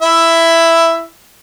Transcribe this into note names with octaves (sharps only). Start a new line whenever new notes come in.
E4 E5